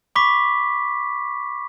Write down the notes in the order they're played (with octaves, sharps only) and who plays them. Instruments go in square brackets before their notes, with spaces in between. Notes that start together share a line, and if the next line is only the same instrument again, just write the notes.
[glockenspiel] B5 C#6 D6 B6